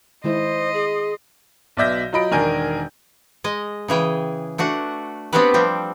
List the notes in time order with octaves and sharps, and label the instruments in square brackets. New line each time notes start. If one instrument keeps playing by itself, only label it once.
[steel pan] D#3 G#3 E4 [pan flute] C5 [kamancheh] D#5 C6
[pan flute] G#4
[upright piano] B1 B2 D5 E5 G6 A#6
F#3 F4 D#5 B5 D7
E1 D#3 D4 A#4 G#5 G6
[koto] G#3 D#5
C#3 E3 G#4 G5
A3 D4 F#4 F#5
B3 C4 D4 F#4 G4 B4
F3 G3 C4